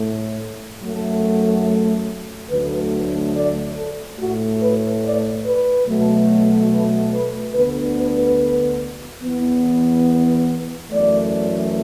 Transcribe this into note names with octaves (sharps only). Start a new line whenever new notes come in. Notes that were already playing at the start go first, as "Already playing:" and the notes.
Already playing: A2 A3
F#2 F#3 A3
D2 D3 F#3 A3 B4
D5
A4
A2 A3 F#4
B4
D5
B4
B2 F#3 A3
B4
B4
D2 D3 B3 B4
B4
E2 E3 B3
B4
F#2 E3 A3 D5